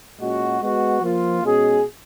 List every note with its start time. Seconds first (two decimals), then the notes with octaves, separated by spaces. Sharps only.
0.20 A#2 G#3 C#4 F#4
0.60 G#3 B3 F#4
1.01 F3 A#3 F4
1.42 B2 G#3 C#4 G#4